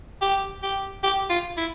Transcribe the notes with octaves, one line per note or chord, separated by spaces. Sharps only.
G4
G4
G4
F4
E4